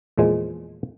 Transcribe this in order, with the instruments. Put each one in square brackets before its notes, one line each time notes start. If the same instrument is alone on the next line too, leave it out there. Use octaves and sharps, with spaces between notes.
[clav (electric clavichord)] E2 A#2 F3 G#3